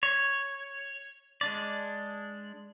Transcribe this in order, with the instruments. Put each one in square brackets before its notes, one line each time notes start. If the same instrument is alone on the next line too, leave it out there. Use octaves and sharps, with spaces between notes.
[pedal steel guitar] C#5
G#3 D4 D5